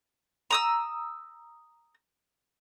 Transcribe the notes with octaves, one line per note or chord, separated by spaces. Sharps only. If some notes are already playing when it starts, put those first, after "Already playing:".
A#5 D#6 E6